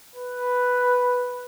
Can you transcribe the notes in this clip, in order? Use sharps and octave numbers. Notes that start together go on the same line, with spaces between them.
B4